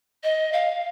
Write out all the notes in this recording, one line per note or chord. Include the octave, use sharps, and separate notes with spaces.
D#5
F5